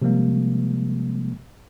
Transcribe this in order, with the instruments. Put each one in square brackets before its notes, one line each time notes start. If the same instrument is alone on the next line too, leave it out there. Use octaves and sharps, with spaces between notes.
[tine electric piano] C3 F3 G3 G#3 A#3